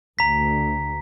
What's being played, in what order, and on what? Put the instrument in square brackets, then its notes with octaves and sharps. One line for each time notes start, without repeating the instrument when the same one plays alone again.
[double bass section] D2 [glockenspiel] A#5 B6